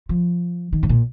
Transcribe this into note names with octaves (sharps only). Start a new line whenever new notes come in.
F3
D#3
G#2
A#2